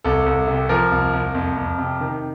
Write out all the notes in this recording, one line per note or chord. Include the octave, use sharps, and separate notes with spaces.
C2 A4
C2
C3
F3 A#4
C2
C2
F2
F2
C3
D#3